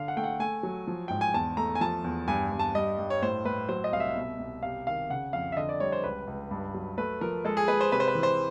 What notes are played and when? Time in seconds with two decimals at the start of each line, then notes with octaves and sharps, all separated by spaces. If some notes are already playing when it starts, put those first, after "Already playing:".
Already playing: D3 F5
0.08 F#5
0.17 A3 G5
0.24 F#5
0.39 A3 G#5
0.63 F#3
0.87 F3
1.08 G#2 G5
1.21 G#5
1.34 E2 A5
1.57 A3 A#5
1.75 G#5
1.81 F3 A5
2.04 E2
2.27 G2 G#5
2.51 G2
2.59 A5
2.75 G3 D#5
2.98 G2
3.10 C#5
3.22 A2 C5
3.45 A2 B4
3.69 F#3 C5
3.84 D#5
3.92 C2 F5
4.00 E5
4.16 B2
4.39 C2
4.63 C3 F5
4.87 D#3 F5
5.10 C#3 F#5
5.33 F2 F5
5.52 E5
5.57 D3 D#5
5.69 D5
5.80 G3 C#5
5.92 C5
6.04 C#2 B4
6.27 C#2
6.51 G2
6.74 F#3
6.97 A3 B4
7.21 F3 A#4
7.45 G#3 A4
7.57 G#4
7.68 G#3 B4
7.80 C5
7.92 C3 B4
8.00 C5
8.08 B4
8.15 E3
8.23 C5